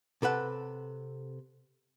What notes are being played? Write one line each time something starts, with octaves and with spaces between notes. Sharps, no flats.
C3 A4 B4 F#5